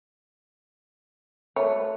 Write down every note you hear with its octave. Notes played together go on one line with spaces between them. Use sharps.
A3 F#4 B4 C#5